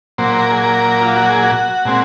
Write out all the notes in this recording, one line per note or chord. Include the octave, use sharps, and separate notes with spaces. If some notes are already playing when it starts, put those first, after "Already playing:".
A#2 F#3 A#3 C5
A#4
G#4
A#4
F4
F#4
G#4
F#4
A#2 G#3 C4